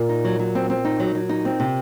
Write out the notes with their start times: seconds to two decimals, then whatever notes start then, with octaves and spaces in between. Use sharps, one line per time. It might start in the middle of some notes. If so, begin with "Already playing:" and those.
Already playing: A#2
0.09 D#4
0.25 F#3
0.39 F#3
0.55 C4
0.70 C4
0.85 D#4
1.00 F#3
1.15 F#3
1.29 D#4
1.45 C4
1.60 C3